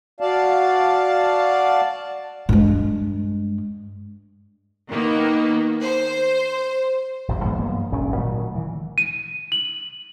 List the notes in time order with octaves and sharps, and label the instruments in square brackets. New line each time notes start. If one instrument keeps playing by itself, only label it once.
[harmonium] F#4 D5 F5 A5
[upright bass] G2 G#3
[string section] D#3 A#3 B3
C5
[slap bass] G#1 F2 C3
G#2 E3 G#3 B3
G2 F#3 A#3 B3
D#1 G#1 D#3 C#4
A#2 D#3 F#3 A3
D#3 E3
[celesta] D#7
F#7